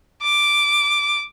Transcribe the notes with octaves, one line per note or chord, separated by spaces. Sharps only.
D6